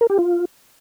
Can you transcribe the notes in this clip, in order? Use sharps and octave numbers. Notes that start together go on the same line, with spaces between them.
A#4
G4
F4